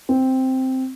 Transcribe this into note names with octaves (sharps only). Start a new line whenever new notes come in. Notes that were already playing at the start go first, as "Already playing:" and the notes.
C4